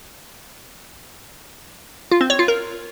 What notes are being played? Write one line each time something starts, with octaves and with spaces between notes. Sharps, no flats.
F4
C4
C#5
F4
A#4